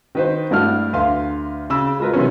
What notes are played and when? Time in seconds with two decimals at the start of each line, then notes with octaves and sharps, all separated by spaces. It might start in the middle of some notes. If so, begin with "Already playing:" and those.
0.15 D#3 B4 C5
0.51 G2 A3 D4 E4 F#5 F6
0.93 D2 B4 F5 C6
1.70 C#3 B5 E6
2.00 G#3 F4 A#4 B4
2.13 C3 E3 F#3 B3 C#4